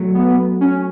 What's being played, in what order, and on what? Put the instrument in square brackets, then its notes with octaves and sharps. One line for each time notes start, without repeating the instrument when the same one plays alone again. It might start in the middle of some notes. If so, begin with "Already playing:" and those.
Already playing: [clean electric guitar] F#3 A3
[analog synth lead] B3
C#4